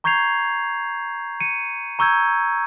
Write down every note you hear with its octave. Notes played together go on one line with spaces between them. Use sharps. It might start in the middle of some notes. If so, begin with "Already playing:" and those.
A#5 C#6 G6 G#6 C7 F7
C#7 D#7
A#5 C#6 E6 G6 G#6